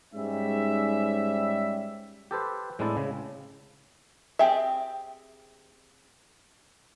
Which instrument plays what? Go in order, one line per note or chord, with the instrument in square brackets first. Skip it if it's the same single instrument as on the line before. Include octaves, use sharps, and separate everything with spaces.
[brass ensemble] G#2 G3 C#4 E5
[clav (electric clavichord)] G4 A4 B4 C5
A2 G#3 C4 D4 E4 A5
C#3
[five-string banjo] C4 G4 G#4 E5